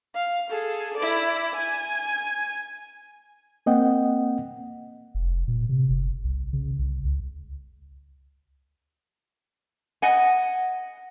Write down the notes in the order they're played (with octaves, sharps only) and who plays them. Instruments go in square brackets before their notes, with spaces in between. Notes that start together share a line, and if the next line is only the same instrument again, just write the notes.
[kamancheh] F5
G#4 A4
E4 D5
G#5
[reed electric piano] A#3 C4 D#5 F#5 G5
[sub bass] F1
A#2
C3
F#1
C2
C#3
C2
C#2
[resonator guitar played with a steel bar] D#5 F#5 G#5